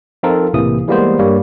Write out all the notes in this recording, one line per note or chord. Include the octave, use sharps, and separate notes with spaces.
F3 C4 D#4 F4 A4 A#4
B1 A2 C3 E3 A#3 D#6
E3 G3 G#3 A#3 B3 C5
G2 G3 A#3 C#5